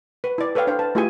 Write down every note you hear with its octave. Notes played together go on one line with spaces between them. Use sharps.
B4
E4 D5
A4 B4 C#5 F5 G5
D4 C5 C#5 F5 G5
B4 A5
A3 E4 F4 G4 G#4 G#5